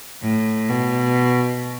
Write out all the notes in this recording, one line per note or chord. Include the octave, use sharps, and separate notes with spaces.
A2
B2